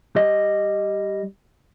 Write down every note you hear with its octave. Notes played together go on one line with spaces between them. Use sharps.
G3 D#5